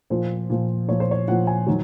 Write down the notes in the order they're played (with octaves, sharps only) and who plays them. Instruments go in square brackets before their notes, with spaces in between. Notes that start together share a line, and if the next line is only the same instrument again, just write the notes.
[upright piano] A#2 F3 C5
A#2 F3
A#2 F3 C#5
C5
C#5
A#2 F3 F#5
G#5
D#3 F#3